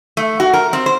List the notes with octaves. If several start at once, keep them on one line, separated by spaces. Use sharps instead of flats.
A3
F#4
A#4
C4
C5